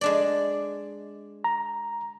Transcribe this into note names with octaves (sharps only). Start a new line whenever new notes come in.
G#3 D4 D5
A#5